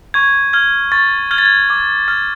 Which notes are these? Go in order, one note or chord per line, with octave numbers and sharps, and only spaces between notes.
C#6 G#6
F6 G#6
C#6 A6
F6 G#6
A6
G#6
D6
F6 G#6